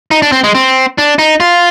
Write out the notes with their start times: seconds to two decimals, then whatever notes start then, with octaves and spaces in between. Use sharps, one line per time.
0.11 D#4
0.22 D4
0.32 C4
0.44 G#3
0.55 C4
0.98 D4
1.19 D#4
1.40 F4